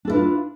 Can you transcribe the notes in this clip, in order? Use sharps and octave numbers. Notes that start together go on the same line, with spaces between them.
D4 E4 F4 A4 B4